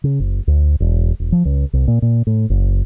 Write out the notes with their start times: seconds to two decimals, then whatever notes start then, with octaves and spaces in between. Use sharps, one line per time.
0.04 C#3
0.20 F#1
0.47 D2
0.80 E1
1.20 E1
1.32 F3
1.45 C#2
1.73 C2
1.88 A#2
2.02 A#2
2.27 A2
2.50 F#1